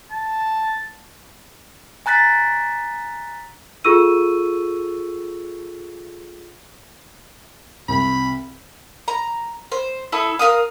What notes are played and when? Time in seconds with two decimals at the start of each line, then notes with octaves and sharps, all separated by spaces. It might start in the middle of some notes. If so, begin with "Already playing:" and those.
0.12 A5
2.06 G#5 A#5 F#6 A6 B6
3.84 F4 G#4 A4 C#6 E6 D#7
7.88 C2 B5
9.08 A#5
9.72 C5
10.12 E4 A4 D#6
10.39 A#4 B4 F5 D#6